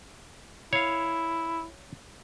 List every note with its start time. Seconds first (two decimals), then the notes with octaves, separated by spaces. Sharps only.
0.73 E4 C#5 F5